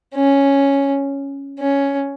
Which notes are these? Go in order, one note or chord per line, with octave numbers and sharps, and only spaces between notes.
C#4
C#4